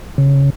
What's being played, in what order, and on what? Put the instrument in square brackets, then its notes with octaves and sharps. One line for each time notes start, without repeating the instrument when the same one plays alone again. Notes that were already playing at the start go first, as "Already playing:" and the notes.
[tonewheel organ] C#3